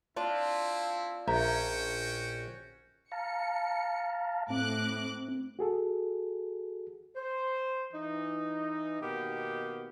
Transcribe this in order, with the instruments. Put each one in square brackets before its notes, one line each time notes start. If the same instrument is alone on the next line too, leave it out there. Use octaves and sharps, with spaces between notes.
[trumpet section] C4 E4 [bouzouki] D4 F4
[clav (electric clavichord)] A#1 [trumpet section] C#4 F#4 G5 [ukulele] E5 A#5
[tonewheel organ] F5 A5 A#5 [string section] C#7
[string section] A2 D6 F#6 [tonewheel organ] C4
[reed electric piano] F#4 G#4 A4
[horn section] C5
E3 D#4
B2 D#3 A#3 B3 G4